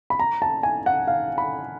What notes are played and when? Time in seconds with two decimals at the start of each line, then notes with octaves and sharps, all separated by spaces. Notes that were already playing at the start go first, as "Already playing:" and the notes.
0.10 B5
0.19 A#5
0.42 A5
0.63 G#5
0.86 F#5
1.07 F5
1.38 B5